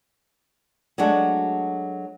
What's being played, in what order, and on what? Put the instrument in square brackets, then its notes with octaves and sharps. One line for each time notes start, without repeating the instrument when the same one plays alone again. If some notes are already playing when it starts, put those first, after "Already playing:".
[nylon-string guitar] F#3 G#3 A3 D4 F#4